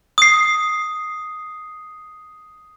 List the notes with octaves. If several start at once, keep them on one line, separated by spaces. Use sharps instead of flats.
D#6 C7